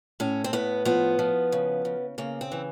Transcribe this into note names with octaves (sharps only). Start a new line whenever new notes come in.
A2 C#4
C4
A2 B3
F3 B3
F3
C#3
C#3
C#3 A#3
C4
E3